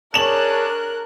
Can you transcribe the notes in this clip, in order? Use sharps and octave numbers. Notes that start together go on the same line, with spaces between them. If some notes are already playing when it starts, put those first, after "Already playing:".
D4 G#4 A#4 C#5 A5 F#6 E7 F#7